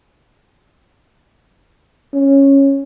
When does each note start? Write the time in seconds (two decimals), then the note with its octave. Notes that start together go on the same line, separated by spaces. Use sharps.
2.14 C#4